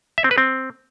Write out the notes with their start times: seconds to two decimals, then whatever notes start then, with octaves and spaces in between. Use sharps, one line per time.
0.18 E5
0.24 C4
0.31 B4
0.38 C4